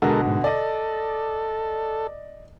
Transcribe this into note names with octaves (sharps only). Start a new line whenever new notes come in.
B2 D3 G#3 F#4 A4 A#4
G#2
A4 D5 D#5